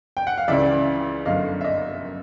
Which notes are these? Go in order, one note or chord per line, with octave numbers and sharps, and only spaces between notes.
G5
F#5
F5
C#2 C#3 E3 D5 E5
G1 F#2 D3 D#5 F5
E5
D#5